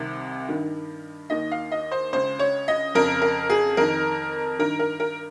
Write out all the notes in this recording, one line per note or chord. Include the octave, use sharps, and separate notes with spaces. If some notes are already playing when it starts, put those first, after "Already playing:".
Already playing: C2 C3 D#3
G2 D#3
D#2 D#3 D#5
F5
D#5
C5
C#2 C#3 C5
C#5
D#5
F2 C#3 A#4
A#4
G#4
F2 D#3 A#4
G2 D#3 A#4
A#4
A#4